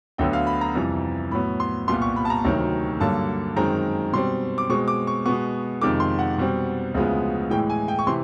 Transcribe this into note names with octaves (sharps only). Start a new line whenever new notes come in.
D2 D3 F#3 B3 G5
F5
B5
A#5
F2 C3 E3 G3
A2 F#3 B3 B5
C6
C2 A#2 G3 B3 C6
C#6
B5
A5
A#5
D2 C3 D#3 F#3
G2 D3 F#3 A#3 A5
F#2 D#3 G#3 C4 A#5
B2 G3 C4 C6
D6
B2 G#3 C4 C#6
D6
C#6
B2 G#3 B3 C#6
F2 C3 D#3 G#3 D6
C6
F#5
B2 G3 C4
D2 C#3 F3 G#3 B3
A2 E3 G#3 G5
G#5
G5
C#6
C3 E3 C6